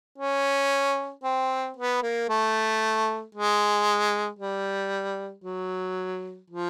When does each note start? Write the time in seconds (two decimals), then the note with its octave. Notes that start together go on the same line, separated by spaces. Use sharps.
0.18 C#4
1.23 C4
1.76 B3
2.03 A#3
2.29 A3
3.35 G#3
4.39 G3
5.44 F#3
6.50 F3